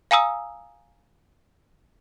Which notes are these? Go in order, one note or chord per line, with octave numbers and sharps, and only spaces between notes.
F5 G#5 A#5 D#6 E6